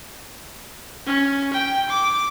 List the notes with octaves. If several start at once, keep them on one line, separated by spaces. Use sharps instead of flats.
C#4
G5
D6